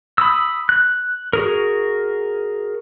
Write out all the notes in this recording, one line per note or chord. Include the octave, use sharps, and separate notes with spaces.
B5 D#6 E6
F#6
F#4 G#4 A#4